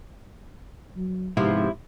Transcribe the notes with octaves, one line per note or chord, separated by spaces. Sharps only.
F#3
G#2 C3 F3 B3 E4